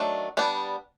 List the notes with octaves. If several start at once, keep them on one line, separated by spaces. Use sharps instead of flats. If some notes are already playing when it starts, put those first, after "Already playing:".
Already playing: D#3 F#3 A3 D4
G3 B3 D4